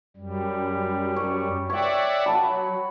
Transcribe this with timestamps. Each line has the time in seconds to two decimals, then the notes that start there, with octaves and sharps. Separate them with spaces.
0.17 F#2 G3
1.16 C#5
1.70 C#5 D5 E5 F#5 G5
2.26 F#3 F#5 A5 B5